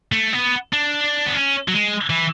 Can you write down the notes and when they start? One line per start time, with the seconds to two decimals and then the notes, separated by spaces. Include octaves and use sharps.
0.12 A3
0.33 B3
0.73 D4
1.26 B3
1.34 C#4
1.68 F#3
1.74 G#3
2.10 E3